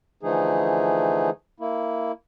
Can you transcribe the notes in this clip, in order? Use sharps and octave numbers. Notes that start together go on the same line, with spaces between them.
D3 E3 F3 A3 D#4 G#4
A#3 E4